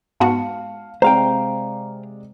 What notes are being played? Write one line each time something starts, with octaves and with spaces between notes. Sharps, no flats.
G#2 B3 F#4 F5 A5 C#7
C3 G#3 C5 D5 F5 G5 A#5